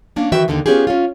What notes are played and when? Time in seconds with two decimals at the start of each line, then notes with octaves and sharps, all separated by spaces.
0.16 A#3 C#4 D4
0.32 D#3 E3 F#4 B4 E5 G5
0.48 D#2 D3 D#3
0.66 B3 C#4 D4 F4 G4 G#4
0.87 C#4 F4